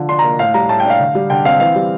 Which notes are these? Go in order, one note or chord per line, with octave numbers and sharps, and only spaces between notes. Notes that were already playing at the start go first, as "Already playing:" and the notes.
Already playing: D3 F3
D4 C6
A#3 A#5
A2 F5
G3 A#5
A2 A5
D4 G5
F5
D3
G3
D3 G5
C4 F5
E3 F5
G3